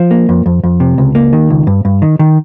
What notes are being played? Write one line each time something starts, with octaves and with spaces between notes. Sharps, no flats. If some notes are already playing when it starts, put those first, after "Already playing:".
Already playing: F3
A#3
F2
F2
F2
C3
C#2
A#3
D#3
C#2
G2
G2
D#3
D#3